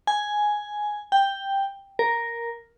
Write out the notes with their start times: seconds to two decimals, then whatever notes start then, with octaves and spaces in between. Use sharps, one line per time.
0.07 G#5
1.12 G5
1.99 A#4